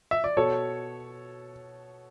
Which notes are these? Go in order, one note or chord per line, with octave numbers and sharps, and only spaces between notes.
E5
D5
B2 A4 C#5